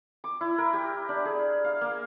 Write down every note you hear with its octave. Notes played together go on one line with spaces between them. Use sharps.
D6
E4
A#4
G4
D4
G#4
F5
A#3